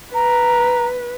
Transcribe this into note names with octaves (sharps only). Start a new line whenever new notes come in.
B4 A#5